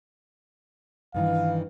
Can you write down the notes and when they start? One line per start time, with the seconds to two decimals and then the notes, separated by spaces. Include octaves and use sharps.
1.14 G2 D#3 E3 F5